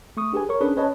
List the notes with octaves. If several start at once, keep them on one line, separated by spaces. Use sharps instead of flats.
A3 C#6 D#6
D4 G4 G#4 B4 G#5
A#4 C#5 C#6
C#4 D4 G#4 B4
C#4 B4 C#5 D#5 A5